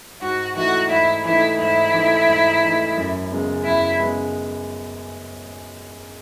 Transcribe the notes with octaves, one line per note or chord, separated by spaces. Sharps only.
G#2 F#4
E3 A3 D#4 F#4
G#2 E4
E3 A3 D#4 E4
G#2 E4
E3 A3 D#4
G#2
E3 A3 D#4
F#2
C#3 G#3 B3
F#2 E4
C#3 G#3 B3